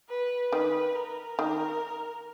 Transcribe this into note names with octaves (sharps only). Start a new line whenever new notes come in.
B4
D#3 B4
A#4
D#3